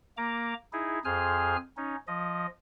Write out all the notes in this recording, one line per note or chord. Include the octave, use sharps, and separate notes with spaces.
A#3 A#5 D6
D#4 E4 G#4
F2 G#4 C5 G#5 F6
C#4 D#4
F3 D#5